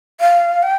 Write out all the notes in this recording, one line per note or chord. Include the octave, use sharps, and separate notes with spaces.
F5
G5